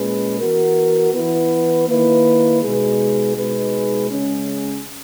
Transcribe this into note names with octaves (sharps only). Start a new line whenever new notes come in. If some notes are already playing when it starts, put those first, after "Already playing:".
Already playing: A#2 G#3 C#4 G#4 B4
E3 B3 F#4 A#4
E3 B3 E4 B4
D#3 A#3 E4 B4
B2 G#3 D#4 G#4 B4
B2 G#3 D#4 G#4 B4
C#3 G#3 C#4